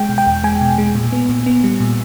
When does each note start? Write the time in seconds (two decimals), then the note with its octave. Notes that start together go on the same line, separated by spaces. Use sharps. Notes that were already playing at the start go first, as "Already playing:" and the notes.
Already playing: G#3 G5
0.09 B2
0.18 G5
0.26 E2
0.44 G#3 G#5
0.61 B2
0.78 G#3
0.95 A#2
1.12 B3
1.29 A#2
1.46 B3
1.64 G3
1.80 A#2